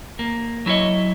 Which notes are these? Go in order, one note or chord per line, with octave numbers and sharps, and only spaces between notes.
A#3
F#3 E4 A4 C#5 D#5